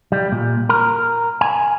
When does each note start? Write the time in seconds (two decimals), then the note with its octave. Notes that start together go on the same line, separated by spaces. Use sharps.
0.12 G3
0.32 A#2
0.69 A#4
1.41 G#5